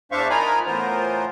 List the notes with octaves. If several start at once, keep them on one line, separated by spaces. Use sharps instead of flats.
E2 D4 C5 E5 F5 C#6
D#4 F4 A#4 G#5 A#5 B5
A2 E3 B3 F4 A#4 C5